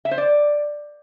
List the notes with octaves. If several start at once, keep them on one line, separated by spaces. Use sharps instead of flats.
E5
C5
D5